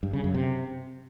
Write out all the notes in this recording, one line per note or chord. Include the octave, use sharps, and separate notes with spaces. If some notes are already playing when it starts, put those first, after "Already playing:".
G2
C#3
F#2
C3